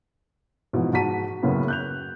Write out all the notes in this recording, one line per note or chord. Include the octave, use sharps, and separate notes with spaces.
G#2 B2 E3 F3
G#2 F#4 A5 A#5 B6 D#7
F#2 A2 C#3 A#3 B3
F#6 G6 F7